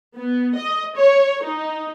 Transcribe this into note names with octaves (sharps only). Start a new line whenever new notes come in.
B3
D#5
C#5
D#4